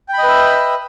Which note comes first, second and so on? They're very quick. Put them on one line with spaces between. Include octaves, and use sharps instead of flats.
G5 B5 D#5 B4 E5